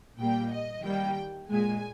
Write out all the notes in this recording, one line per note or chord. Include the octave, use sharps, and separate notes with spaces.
A#2 G3 A#3 G5
D#5
D#3 G3 A#3 G5
A#2 G#3 G#5